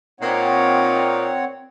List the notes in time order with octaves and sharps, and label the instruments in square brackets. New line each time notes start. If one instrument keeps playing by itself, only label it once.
[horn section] A#2 D#4 [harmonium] C4 C#5 F#5